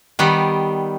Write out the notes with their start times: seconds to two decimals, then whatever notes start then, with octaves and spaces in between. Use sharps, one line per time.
0.19 D#3 G3 B3